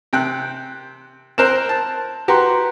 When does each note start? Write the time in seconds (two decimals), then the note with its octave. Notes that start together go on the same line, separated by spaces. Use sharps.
0.13 C3 G5 F#6
1.38 C4 A#4 C5 F#6 E7
1.69 A5
2.28 F#4 G4 B4 A#5 C6